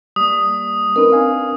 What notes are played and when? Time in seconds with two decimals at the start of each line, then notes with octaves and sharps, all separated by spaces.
0.16 G3 A#3 D#6
0.96 C4 C#4 D#4 A#4 B4
1.11 D4 F5 G#5